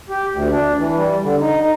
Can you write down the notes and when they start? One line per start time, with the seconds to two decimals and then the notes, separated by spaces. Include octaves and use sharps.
0.10 G4
0.33 D2
0.51 D4
0.78 E3
0.97 G3
1.23 D3
1.40 D#4
1.62 D#4